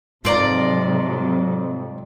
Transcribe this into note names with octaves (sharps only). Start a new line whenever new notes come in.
F2 G#2 C3 F#3 F4 D5 A#5